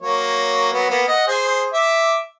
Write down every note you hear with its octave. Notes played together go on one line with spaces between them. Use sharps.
F#3 A#3 C#5
F#3 B3
A#3 B3
D#5 F#5
G#4 C5 G#5
E5 D6